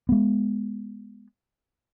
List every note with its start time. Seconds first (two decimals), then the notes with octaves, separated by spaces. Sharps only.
0.09 G#3 B3